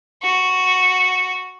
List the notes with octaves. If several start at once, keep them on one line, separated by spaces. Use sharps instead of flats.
F#4